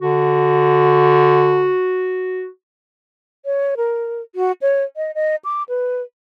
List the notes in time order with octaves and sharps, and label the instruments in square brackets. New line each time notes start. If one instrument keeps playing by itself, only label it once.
[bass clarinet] D3 [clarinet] F#4
[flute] C#5
A#4
F#4
C#5
D#5
D#5
D6
B4